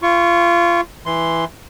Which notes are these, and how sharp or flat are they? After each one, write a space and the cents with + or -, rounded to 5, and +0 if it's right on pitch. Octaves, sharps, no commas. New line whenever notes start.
F4 -25 C#6 +0
E3 +0 C6 +0